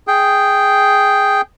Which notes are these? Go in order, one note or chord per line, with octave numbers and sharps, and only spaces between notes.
G#4 G5